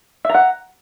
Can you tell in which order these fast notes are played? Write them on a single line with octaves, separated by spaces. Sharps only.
E5 A#5 F#5